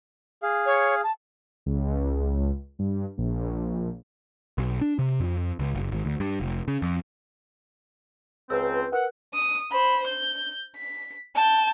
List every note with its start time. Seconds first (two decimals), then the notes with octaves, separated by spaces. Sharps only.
0.43 G#4 F5
0.66 C#5
1.03 A5
1.66 C#2
2.79 G2
3.18 A#1
4.58 B1
4.81 D4
4.99 C3
5.20 F2
5.59 C#2
5.75 F#1
5.91 G#1
6.05 D2
6.20 G2
6.40 F1
6.68 C#3
6.82 F2
8.50 C#2 C4 B4 E6
8.73 B4
8.93 A#4 B4 F#5
9.34 D#6
9.72 C5 B5
10.07 G6
10.77 B6
11.35 G5 A5